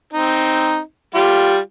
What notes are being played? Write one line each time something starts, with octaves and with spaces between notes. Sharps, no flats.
C4 D#4
G3 F4 G4